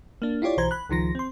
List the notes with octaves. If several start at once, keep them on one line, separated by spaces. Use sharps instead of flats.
A#3 D4
E4 F4 G4 C#5 D5
B1 E3 C5 A#5 G#6
B5 F#6
C#2 D#3 F3 A#6
C4 C6